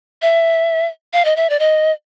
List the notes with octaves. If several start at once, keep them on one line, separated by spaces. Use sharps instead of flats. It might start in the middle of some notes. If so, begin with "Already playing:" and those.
E5
F5
D#5
E5
D5
D#5